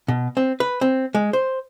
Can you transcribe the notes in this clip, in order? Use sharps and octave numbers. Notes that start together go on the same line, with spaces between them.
B2
C4
B4
C4
G#3
C5